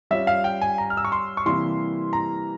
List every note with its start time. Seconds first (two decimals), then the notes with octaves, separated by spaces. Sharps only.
0.11 G3 C#4 F4 E5
0.27 F5
0.44 G5
0.62 G#5
0.78 A#5
0.90 F6
0.97 E6
1.05 C#6
1.12 C6
1.37 C#6
1.46 C3 E3 G3 A#3 E4 C6
2.13 A#5